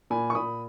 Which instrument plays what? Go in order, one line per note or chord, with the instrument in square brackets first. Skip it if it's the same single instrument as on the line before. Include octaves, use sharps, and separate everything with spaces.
[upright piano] A#2 G#5 B5
C#6
A#2 B5 D#6